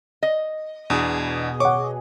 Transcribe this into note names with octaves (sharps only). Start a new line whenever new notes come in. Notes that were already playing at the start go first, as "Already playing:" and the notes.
D#5
E2 B2 D4 G#4 D#6
C#5 F#5 C#6 D6